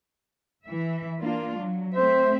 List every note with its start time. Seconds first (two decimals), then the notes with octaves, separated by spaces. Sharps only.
0.66 E3 E5
1.21 A#3 D4 F4
1.59 F#3
1.95 A3 C4 C5 E5